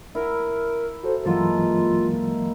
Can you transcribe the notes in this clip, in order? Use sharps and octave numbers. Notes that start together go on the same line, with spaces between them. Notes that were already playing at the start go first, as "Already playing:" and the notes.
E4 A#4 A#5
F#4 A4 C5
G2 E3 F#3 G#3 A#3 F4 A4